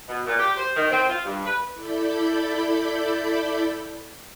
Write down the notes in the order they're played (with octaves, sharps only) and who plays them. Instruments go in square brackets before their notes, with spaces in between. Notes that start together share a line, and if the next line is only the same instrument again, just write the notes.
[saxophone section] B2
A#2
G4
C5
D#3
C4
F4
G2
B4
[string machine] E4 A4 D5 B5 G6